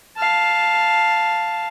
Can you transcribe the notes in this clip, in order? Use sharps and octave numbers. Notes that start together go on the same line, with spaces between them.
F5 A5